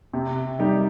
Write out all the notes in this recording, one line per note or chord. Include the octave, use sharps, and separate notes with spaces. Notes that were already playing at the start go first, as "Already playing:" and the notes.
C3
G3 D#4 G4